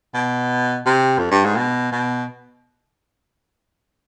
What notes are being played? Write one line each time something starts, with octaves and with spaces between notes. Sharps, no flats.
B2
C3
F2
G2
G#2
B2
B2